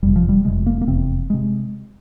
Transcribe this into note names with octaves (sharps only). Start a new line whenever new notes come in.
F1 E2 C3 G3
F3
G3
F1 E2 C3 G#3
A#3
A#3
F1 E2 C3 C4
C3 G#3